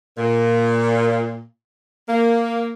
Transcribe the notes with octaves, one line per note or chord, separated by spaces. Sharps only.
A#2
A#3